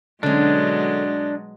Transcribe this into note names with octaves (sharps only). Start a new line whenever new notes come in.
B2 D3 F#3 G#3 C#4 D4